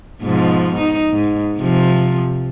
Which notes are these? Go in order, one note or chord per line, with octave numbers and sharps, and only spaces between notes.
G#2 B2 F3
D#4
G#2
C3 F3